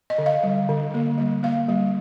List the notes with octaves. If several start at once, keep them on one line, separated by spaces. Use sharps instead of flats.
D#5
D3
F5
G3
D3
A#3
G3
A#3 F5
G3